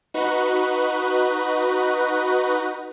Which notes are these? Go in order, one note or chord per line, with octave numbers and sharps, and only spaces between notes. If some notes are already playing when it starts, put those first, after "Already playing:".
D#4 F#4 B4